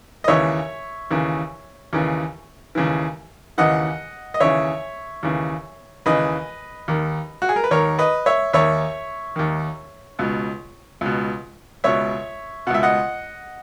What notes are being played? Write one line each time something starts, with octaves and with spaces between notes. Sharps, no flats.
D#5
D#2 C#3 E3 C#5 E5
D#2 C#3 E3
D#2 C#3 E3
D#2 C#3 E3
D#2 C#3 E3 D#5 F#5
D#5
D#2 C#3 E3 C#5 E5
D#2 C#3 E3
D#2 C#3 E3 B4 D#5
D#2 D#3
F#4
G#4
A#4
B4
D#2 D#3 A#4 C#5
B4 D#5
C#5 E5
D#2 D#3 C#5 E5
D#2 D#3
C#2 B2
C#2 B2
C#2 B2 C#5 E5
C#2 B2 E5 F#5
D#5 F#5